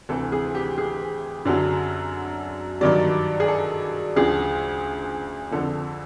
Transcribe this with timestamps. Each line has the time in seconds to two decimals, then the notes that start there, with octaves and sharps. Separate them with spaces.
0.09 D2 C3 E3 A4
0.32 G#4
0.55 G4
0.78 G#4
1.45 F#2 D3 F#3
2.81 G2 D#3 F#3 D5
3.40 G#4
3.48 A4
4.16 D2 C#3 F3 G#4
5.51 F2 D3 F3 A4